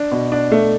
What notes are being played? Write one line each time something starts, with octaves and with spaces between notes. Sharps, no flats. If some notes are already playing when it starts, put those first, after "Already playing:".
Already playing: D4
B2
D4
A3